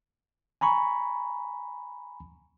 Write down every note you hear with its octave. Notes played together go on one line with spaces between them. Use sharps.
G#5 A#5 B5 C#6